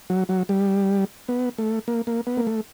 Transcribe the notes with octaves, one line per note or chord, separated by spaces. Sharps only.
F#3
F#3
G3
B3
A3
A#3
A#3
B3
A#3
A3